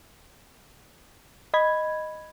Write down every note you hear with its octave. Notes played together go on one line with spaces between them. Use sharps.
D#5 B5 G#6